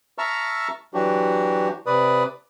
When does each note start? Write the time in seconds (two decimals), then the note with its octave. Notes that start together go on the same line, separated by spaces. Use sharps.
0.18 E5 A5 A#5 C#6 E6 F6
0.94 E3 F#3 D4 F#4 G4
1.86 C3 B4 D5 D#6